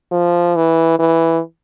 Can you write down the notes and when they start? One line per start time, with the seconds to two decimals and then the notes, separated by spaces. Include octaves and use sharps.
0.12 F3
0.56 E3
0.99 E3